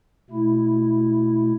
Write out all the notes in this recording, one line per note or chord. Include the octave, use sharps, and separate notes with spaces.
B2 A3 E4